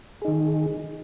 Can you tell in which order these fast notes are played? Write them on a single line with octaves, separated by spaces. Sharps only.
G#4 D#4 D#3